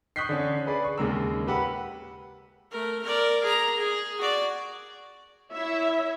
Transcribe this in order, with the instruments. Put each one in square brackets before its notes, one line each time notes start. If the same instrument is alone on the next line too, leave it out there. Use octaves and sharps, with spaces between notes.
[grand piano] C#6 D#6 F#6 G6 B6 C7
D3 C#4
G#4 B4 D5
C#6
D#2 C#3 G#3 A#4 E6
G4 B4 F#5 E6
[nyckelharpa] A3 A#4
A#4 D5
G#4 A#5
G#4
F#4 D5
[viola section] E4 C#5 E5